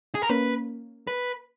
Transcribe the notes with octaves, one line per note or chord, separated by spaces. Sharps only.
G#4
A#4
A#3 C#4 B4
B4